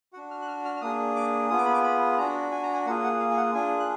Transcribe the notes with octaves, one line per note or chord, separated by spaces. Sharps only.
D4 F#4 F#5
F6
F#6
F6
F6
F6
A#3 D4 G#4 D#6
D6
B3 F4 G#4 D#6
D6
B5
D6
B5
D4 F#4 A#5
G#5
A#5
G#5
A#3 F4 G#4 F#5
F#5
F5
G#5
F#5
D4 F4 G#4 G#5
F#6